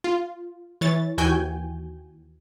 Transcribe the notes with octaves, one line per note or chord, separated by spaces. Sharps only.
F4
E3 C#5 A6
D#2 E3 F#4 G5 G#5 G6